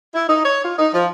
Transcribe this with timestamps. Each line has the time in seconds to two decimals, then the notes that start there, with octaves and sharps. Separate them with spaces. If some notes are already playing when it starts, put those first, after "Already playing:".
0.14 E4
0.29 D#4
0.45 C#5
0.65 F4
0.78 D#4
0.94 F3